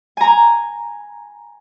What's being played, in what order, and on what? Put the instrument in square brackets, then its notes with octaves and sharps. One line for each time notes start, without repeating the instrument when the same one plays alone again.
[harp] G#5 A#5